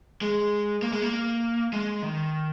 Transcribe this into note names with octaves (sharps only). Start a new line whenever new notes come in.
G#3
A#3
G#3
A#3
G#3
D#3